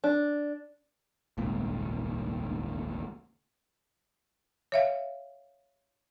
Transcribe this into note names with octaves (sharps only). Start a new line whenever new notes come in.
D4
D#1 G#1 C#2 A#2
C#5 E5 F5